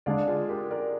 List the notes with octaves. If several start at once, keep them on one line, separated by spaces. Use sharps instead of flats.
D3 G#3 D4 D5 F5
F4 G#4
G4 A#4
A#4 D5